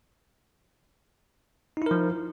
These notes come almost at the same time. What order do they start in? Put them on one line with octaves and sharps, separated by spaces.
D#4 E4 A#4 F3